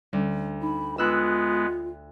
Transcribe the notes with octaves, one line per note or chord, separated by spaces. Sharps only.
D2 G3 C#4
D#4 B5
G#3 B3 F4 B4 B5 E6 F#6